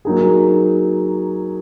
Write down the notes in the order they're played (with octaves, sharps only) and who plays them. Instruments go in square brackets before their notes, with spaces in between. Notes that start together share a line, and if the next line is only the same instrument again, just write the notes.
[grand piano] F#3 A#3 D#4 G#4